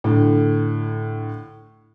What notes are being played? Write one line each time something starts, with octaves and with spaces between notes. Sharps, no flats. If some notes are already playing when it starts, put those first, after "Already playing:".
A2 D3